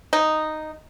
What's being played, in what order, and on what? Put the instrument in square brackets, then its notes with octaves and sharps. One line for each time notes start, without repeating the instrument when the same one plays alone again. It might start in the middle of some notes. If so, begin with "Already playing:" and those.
[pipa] D#4